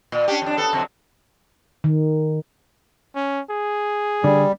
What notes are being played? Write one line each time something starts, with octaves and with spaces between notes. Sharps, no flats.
A#2
C#4 D4 G4
F2 D4
B3 A4
F2 C3 F#3
D#3
C#4
G#4
D3 G3